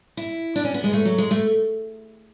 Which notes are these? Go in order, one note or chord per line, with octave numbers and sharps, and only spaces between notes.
E4
D4
C#4
B3
G#3
A3
F#3
G#3
A3